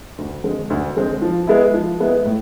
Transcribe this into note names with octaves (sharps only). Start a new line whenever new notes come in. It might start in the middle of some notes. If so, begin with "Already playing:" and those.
D2
D3 G#3 C4
D2
D3 G#3 C4
F3
G#3 B3 E4
F3
G#3 B3 E4
A2